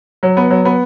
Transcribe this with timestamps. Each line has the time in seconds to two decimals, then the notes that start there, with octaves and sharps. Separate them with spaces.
0.23 F#3
0.37 B3
0.50 F#3
0.65 B3